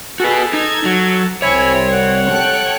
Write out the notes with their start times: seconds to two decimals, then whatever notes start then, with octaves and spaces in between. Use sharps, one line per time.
0.20 F#4 G#4 A4 B4
0.53 D#4 G#6
0.85 F#3
1.42 C2 C4 E4 C#5 G#5 B5
1.92 F#5
2.30 A4 G5 F#6